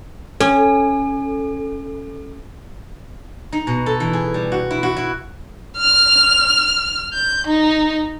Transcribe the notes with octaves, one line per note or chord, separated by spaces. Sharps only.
C#4 A4
D#4
B2
A4
E3
G#4
G3
F#4
E4
F#4
E4
F6
G6
D#4